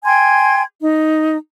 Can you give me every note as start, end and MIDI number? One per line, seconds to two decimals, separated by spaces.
0.04 0.62 79
0.04 0.62 80
0.04 0.62 84
0.04 0.62 92
0.81 1.36 63